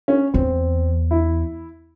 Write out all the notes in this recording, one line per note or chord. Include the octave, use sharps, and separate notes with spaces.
C#4
E2 C4
E4